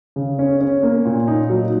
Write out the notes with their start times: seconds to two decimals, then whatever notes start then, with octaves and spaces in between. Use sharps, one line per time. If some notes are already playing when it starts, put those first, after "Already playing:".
0.16 C#3
0.39 C#4
0.61 C#4
0.83 A#3
1.05 A#2
1.28 D#4
1.50 F#3